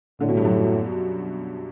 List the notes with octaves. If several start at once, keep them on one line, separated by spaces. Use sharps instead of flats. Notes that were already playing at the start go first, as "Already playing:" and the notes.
A2 D3
B2
G2
F#2
G2